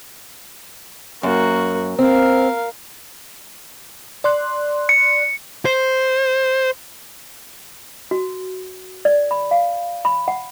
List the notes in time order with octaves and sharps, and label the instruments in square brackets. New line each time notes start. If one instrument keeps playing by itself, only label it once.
[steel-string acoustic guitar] F#2 [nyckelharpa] A#3 F#4
[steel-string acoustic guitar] C4 [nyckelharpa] A#4 F5
[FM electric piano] D5 C6 F#6
[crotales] C#7
[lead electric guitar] C5
[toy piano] F#4
D5
B5
F5
B5
F#5